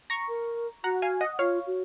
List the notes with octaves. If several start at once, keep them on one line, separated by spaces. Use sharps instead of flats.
A#5 C#6
A#4
F#4 F#5 A#5
F5 G#5
D#5 F#5
F4 C#5 F5
F#4